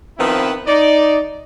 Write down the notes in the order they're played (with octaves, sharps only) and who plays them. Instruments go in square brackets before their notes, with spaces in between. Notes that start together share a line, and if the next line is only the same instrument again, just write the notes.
[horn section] D#3 F3 B3 C4 E4 B4
D#4 D5